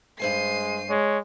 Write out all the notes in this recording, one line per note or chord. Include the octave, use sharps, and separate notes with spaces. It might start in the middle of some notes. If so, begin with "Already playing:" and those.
G2 G#3 C5 G#5 C7 D#7
G#3 C#5